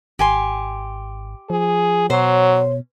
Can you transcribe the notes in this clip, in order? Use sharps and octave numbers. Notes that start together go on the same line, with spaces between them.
G#1 G4 G#5 C6
F3 G#4
B2 F#3 C5 C#5